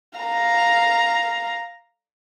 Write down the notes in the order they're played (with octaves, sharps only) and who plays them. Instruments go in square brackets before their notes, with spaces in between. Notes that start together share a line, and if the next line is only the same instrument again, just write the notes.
[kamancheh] F5 A#5